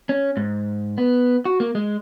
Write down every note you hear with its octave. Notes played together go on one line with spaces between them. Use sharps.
C#4
G#2
B3
F#4
A#3
G#3